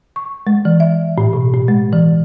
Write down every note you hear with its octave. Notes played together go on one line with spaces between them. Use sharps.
C#6
G#3
E3
E5
A2
B2
A2
G#3
E3